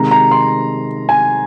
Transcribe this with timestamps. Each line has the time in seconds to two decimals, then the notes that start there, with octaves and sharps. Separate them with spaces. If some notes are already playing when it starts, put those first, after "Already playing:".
Already playing: C3 D#3 G#3 A#5
0.11 A#5
0.31 C6
1.09 G#5